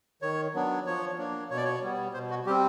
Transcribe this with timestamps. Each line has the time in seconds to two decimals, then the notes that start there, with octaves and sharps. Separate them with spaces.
0.22 D#3 C#5
0.54 F#3 B3 D4
0.86 F3 C#5
1.18 A#3 D4
1.50 B2 C#5
1.57 D5
1.64 C#5
1.82 G3 B3
2.14 B2 C5
2.30 F#4
2.46 G3 G4
2.49 C4